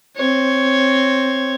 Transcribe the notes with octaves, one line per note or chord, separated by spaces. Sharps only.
C4 C#5